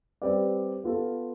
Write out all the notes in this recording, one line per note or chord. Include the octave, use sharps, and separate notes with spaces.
G3 C4 G4 B4 D5
B3 F4 A4